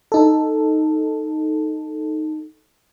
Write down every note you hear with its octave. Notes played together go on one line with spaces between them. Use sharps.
D#4 A4